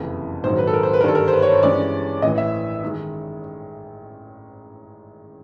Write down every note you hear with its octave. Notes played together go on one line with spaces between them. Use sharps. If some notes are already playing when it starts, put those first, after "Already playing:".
Already playing: F#1 F2 C3 E3
A#1 G#2 D#3 F#3 C5
B4
A4
A#4
C5
B4
A#4
G1 G2 D#3 G3 A4
A#4
C5
B4
C#5
C5
G2 E3 G#3 C#4 D5
A1 A2 E3 D#5
E5
D#3 G#3